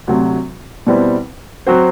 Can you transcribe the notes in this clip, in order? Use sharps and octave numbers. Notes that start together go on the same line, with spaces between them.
D2 C3 F#3
B2 G3 C4 E4 B4
F#3 C4 F#4 C5